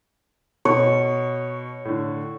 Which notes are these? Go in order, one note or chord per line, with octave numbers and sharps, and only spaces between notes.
B2 C#5
A2 D3